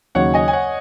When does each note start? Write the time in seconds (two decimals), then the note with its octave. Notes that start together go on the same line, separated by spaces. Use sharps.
0.15 D#2 C#3 F#3 D#4 C#5 F#5
0.34 D#5 G#5
0.48 G#5
0.53 C#5 F#5